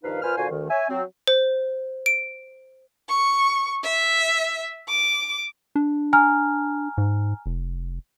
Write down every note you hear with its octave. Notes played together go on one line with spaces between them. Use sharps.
G2 D#3 F3 D#4 B4 F5
A#2 F4 B4 C5 G#5 F6
A#2 D3 F4 F#4 C5 G#5
D2 D#3
C#5 E5 G#5
F#3 C4
C5
D7
C#6
E5
D6
D4
G#5 A#5 F6
G#2
F1